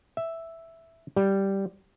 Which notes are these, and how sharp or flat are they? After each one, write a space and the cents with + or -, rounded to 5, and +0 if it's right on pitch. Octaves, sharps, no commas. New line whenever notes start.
E5 +0
G3 -5